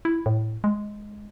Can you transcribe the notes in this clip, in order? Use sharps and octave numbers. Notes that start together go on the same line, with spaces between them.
E4
A2
G#3